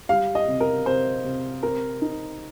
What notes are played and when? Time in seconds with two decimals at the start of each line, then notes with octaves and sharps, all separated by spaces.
0.09 G3 F5
0.35 D#5
0.48 C3
0.60 A#4
0.86 C3 C5
1.25 C3
1.63 C4 A#4
2.02 D#4